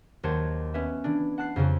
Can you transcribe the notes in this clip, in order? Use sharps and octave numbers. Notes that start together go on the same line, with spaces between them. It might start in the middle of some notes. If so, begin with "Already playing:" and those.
D#2 F#3 C5 A5 G#6 C#7
B3 C#4 B4 E5
E3 D4
F#5 A5 F#6 C7
F2 C#3 F3 F#3